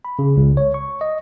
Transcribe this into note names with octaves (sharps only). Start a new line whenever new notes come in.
B5
C#3
C#2
C#5
C#6
D#5